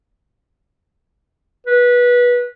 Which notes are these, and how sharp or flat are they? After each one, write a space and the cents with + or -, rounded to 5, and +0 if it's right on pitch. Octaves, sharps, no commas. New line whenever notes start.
B4 -20